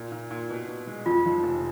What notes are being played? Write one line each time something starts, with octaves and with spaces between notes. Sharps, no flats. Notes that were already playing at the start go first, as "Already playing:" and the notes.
Already playing: A#2
A#2
A#2
B2
B2
G#3
F2 F4
F3
F1